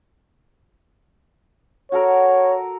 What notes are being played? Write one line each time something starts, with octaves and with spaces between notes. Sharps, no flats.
F#4 A4 A#4 C#5